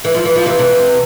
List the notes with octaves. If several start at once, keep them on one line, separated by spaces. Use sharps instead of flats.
E3
F3
E3
F3
C3 E3
C3 E3